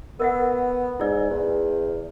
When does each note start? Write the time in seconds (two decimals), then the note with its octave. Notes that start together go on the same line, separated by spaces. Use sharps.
0.20 B3 A#4 E5 F#5
1.00 G#2 E4 D5
1.30 E2